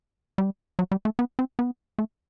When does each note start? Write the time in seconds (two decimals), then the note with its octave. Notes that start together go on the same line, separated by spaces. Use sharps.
0.38 G3
0.79 F#3
0.92 G3
1.05 A3
1.19 B3
1.39 C4
1.59 B3
1.99 A3